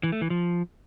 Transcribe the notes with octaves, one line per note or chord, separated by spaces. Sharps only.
E3
A3
E3
F3